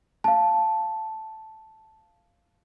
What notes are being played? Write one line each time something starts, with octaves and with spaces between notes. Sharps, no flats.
F5 A5